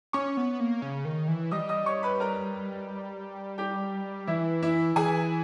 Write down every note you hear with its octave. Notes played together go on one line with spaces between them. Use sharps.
C#4 C#5 C#6
B3
A#3
C#3
D#3
E3
G3 D#5 D#6
D#5 D#6
C#5 C#6
B4 B5
A#4 A#5
G4 G5
E3 E4 E5
E4 E5
E3 G#4 G#5